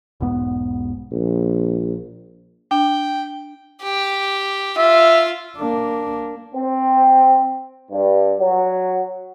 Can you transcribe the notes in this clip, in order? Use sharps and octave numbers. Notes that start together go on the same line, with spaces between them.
E1 B1 G#2 B3
A#1
D4 G5
G4
F4 E5
A#3 D4
C4
G2
F#3